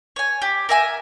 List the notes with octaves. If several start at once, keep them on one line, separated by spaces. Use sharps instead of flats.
C#5 G#5
G4
A#4 E5 G#5